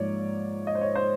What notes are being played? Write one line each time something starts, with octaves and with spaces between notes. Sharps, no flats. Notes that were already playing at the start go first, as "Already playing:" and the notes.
Already playing: G#2 F3 A#3 C#5 D5
D#5
C5
C#5
C5